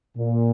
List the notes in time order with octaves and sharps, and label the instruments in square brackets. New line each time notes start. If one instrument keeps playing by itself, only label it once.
[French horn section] A#2